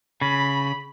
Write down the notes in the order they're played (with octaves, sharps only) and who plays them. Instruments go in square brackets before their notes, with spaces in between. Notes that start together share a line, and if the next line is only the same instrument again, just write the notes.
[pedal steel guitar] C#3 [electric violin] B5